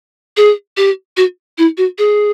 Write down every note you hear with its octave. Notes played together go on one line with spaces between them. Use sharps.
G#4
G4
F#4
E4
F#4
G#4